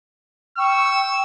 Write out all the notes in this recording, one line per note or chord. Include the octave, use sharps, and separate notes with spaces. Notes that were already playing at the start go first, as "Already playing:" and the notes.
G5 C#6 E6